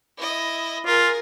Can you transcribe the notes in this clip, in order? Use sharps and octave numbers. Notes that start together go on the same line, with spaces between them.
E4 D#5
F4 G#4 A#4